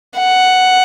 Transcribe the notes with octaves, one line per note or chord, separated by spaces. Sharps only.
F#5